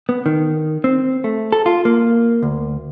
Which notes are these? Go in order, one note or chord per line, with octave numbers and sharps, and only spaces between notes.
B3
D#3
C4
A3
A4
F4
A#3
D2